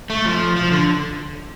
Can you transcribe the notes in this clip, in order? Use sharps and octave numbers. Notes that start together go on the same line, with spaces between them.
A3
F3
F3
D3